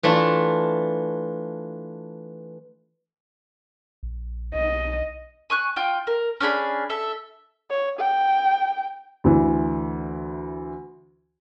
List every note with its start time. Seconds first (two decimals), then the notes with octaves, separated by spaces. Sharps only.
0.03 E3 A3 D4 F4
4.03 A#1
4.55 B1 D#5
5.50 G#5 C#6 F#6
5.76 F4 G5
6.07 A#4
6.40 C#4 D4 G#4 B5
6.90 A4 E5
7.70 C#5
7.99 G5
9.24 D2 E3